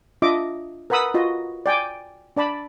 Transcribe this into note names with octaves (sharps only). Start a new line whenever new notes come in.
D4 F4 D#5 E5 D6
A#4 B4 F#5 B5 D#6 E6
F4 F#4 D#5
D5 G5 G#5 D6
D4 D5 A5 B5